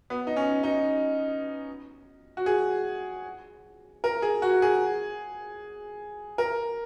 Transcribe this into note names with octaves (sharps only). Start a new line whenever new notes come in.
B3
D#4
C#4
D#4
F#4
G#4
A#4
G#4
F#4
G#4
A#4